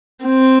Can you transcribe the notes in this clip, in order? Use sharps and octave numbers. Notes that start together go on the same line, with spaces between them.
C4